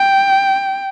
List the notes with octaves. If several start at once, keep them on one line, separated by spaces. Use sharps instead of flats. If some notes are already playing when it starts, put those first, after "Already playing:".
Already playing: G5